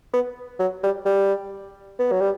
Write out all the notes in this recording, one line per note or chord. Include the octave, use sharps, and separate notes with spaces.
B3
F#3
G3
G3
B3
F#3
G3